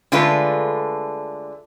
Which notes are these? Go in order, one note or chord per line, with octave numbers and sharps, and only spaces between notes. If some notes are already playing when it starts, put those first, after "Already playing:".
D3 G#3 A3 F4 A4 B4